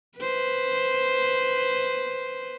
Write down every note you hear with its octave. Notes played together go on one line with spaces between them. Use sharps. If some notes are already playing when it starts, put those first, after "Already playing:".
B4 C5